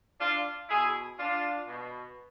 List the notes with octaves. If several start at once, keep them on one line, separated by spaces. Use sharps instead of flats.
D4 F4
B2 E4 G#4
D4 F4
B2